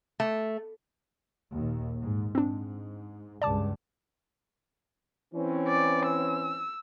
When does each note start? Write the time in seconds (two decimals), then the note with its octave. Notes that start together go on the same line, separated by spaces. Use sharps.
0.20 A3
1.54 A#1 D#2
2.02 G#2
2.35 G#2 C4 D4
3.42 C#2 G2 D5 A5 D6
5.34 E3 C4 C#4
5.68 D5
6.06 E6